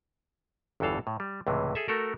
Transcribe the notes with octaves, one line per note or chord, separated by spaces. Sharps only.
G1 E2 G2 E3 A4 F5
A2
G3
C#2 A2 C3 E3
G#4 A4 E5
A3 F#4 A4 A#4